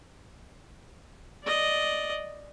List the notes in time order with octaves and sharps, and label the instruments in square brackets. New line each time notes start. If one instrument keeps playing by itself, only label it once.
[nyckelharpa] D5 D#5